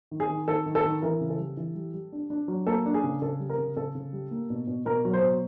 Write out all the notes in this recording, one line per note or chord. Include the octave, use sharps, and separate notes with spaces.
D#3
G#4
D#3
D#3 A4
D#3
A4
D#3
E3 A#4
C#3
A4
G3
E3
G3
G3
D4
D4
F#3
A#3 A4
D4
G#4
C#3
C#3 A4
G3
A#4
C#3
C#3 A4
C#3
G3
A#3
B2
B2
B2 A#4
F#3
C5
B2